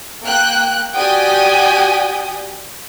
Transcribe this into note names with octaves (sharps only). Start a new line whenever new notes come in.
A#3 G5 F#6
F#4 G4 D5 G5 G#5 D#6